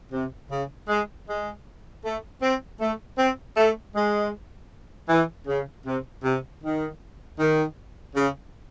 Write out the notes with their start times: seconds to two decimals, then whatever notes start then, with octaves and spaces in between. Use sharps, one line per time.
0.12 C3
0.50 C#3
0.88 G#3
1.27 G#3
2.04 A3
2.41 C4
2.80 A3
3.18 C4
3.57 A3
3.95 G#3
5.09 E3
5.47 C#3
5.85 C3
6.24 C3
6.63 D#3
7.39 D#3
8.15 C#3